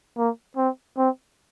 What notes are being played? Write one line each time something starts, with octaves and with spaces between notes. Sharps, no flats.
A#3
C4
C4